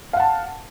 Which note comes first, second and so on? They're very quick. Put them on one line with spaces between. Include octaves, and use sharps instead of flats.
F5 F#5 A5